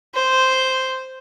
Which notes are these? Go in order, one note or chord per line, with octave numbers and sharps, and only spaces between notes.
C5